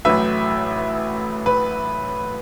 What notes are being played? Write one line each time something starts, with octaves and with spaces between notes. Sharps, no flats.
A1 A2 F#3 A3 B4 E5
B4